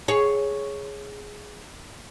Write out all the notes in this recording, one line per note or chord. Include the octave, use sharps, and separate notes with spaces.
G#4 C#5